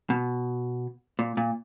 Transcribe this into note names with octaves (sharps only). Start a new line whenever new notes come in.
B2
A#2
A#2